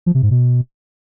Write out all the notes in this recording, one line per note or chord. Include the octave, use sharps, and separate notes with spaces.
F3
C3
G#2
B2